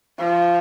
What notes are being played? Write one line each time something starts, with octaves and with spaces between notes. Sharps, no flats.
F3